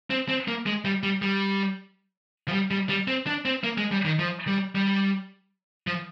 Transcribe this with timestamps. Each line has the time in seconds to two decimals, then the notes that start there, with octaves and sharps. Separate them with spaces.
0.10 C4
0.29 C4
0.48 A#3
0.66 G#3
0.85 G3
1.03 G3
1.22 G3
2.48 F3
2.52 G3
2.71 G3
2.89 G3
3.08 C4
3.27 D4
3.45 C4
3.64 A#3
3.78 G#3
3.92 G3
4.05 D#3
4.19 F3
4.48 G3
4.75 G3
5.87 F3